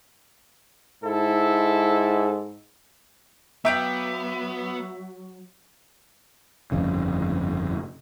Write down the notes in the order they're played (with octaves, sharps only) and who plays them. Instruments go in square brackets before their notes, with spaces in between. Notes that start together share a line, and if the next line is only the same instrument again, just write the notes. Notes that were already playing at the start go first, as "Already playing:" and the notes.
[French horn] G#2 [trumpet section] E4 A4
[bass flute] F#3 [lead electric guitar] B3 [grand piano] E5 A#5 D7 [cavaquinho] F5 G5 D6
[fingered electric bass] G1 F2 C#3